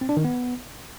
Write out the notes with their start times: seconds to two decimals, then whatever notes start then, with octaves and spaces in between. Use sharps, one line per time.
0.01 C4
0.09 D4
0.17 D#3
0.24 B3